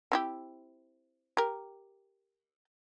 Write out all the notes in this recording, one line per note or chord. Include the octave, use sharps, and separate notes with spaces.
C4 E4 G4
G4 A#4